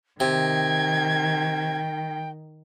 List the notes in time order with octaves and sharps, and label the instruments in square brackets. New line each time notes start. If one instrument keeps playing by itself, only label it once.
[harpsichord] C3 [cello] D#3 [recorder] G5 [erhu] G#6